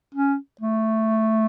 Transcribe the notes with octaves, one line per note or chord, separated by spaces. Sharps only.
C#4
A3